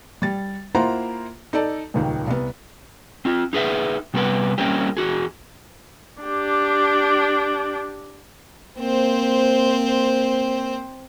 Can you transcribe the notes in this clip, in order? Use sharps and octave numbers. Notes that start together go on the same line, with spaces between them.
G3 A6
A#3 E4 F4 C5 F#5 A#5
D#4 A4 D5 A5
D#1 C#2 D#3
C2 B3
C4 F4
D#4 G#4 B4 E5
C3 G3 B3 G4 A#4 B4
G3 A#3 C4 C#4 G4
E2 C3 F#4 G#4
D4 G4
A#3 C4 C5